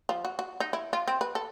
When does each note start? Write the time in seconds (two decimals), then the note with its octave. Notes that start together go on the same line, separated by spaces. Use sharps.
0.09 F3
0.25 F#4
0.39 F#4
0.60 D#4
0.73 E4
0.93 F4
1.08 C4
1.21 B4
1.35 A4